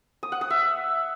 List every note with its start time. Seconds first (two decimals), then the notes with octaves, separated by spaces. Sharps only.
0.23 D#6
0.32 F#5
0.41 D#6
0.50 E5